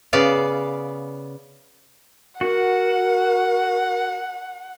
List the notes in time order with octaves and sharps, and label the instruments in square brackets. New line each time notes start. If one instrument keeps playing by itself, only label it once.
[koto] C#3 B3 D5 F5
[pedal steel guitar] F#4 [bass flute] A#4 [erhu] F#5